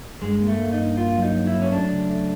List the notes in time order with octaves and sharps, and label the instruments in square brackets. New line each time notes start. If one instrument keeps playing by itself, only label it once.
[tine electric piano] G2 [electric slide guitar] G#3
[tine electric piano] A#3
[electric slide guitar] A3
[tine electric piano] A#3
[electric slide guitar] D#4
[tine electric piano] G2
[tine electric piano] A#3 [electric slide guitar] F4
[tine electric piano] F#3
[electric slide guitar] D#4
[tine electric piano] F#3
[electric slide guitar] E4
[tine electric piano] F#3
[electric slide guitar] C#4
[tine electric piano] A3 [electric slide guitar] D4
[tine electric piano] C#3
A3